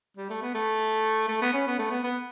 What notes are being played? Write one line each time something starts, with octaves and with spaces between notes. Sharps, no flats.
G3
A3
B3
A3
A3
B3
C#4
B3
A3
B3
B3